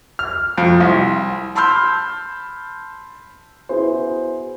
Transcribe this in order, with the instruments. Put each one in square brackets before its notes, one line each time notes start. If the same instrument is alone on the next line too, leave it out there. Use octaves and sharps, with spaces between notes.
[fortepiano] F6
F2
C2
[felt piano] A5 B5 C6 E6 F6 G6
[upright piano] B3 E4 F#4 G#4 B4 C5